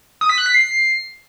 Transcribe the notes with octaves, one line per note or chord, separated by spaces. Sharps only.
D#6
B6
F#6
B6
C7